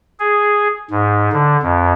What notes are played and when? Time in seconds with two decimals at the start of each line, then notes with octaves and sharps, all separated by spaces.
0.20 G#4
0.91 G#2
1.33 D3
1.63 F2